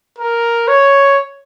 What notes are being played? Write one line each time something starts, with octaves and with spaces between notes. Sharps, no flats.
A#4
C#5